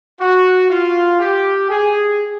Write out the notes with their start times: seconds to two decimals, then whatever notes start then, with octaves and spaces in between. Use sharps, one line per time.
0.20 F#4
0.70 F4
1.20 G4
1.70 G#4